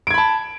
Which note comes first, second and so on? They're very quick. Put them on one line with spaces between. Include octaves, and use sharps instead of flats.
D7 G#6 B5 A5